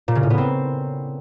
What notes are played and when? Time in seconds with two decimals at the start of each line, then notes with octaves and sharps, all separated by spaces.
0.08 A#2
0.15 C#3
0.23 A2
0.30 B3
0.38 C4